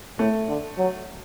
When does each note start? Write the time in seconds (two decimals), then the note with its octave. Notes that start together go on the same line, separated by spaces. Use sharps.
0.19 A2 A3
0.48 D3
0.78 F#3